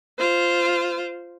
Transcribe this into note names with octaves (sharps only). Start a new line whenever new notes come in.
F4 C5